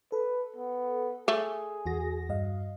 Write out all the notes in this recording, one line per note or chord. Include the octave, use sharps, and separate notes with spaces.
A4 B4
B3
A3 G#4
E2 F#4 A#6
G2 D#5 F5